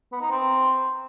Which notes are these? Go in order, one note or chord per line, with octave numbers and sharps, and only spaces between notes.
B3
D#4
C4